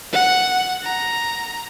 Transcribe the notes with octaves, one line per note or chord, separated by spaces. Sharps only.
F#5
A#5